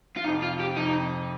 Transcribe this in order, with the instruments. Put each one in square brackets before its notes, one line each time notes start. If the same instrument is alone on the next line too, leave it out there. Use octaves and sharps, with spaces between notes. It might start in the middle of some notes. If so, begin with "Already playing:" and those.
[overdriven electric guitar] F4
[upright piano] F2 C3 F3 [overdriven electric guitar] D#4
[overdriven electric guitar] F4
G4
[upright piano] F2 C3 F3 [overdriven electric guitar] D#4